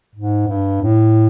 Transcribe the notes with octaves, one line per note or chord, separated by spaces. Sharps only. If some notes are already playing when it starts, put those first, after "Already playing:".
G#2
G2
A2